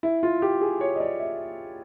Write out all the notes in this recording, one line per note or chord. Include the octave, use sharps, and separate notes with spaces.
E4
F4
G4
G#4
C#5
D#5
D5
E5